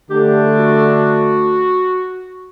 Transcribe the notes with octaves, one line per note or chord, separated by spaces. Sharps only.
D3 A3 D4 G4
F#4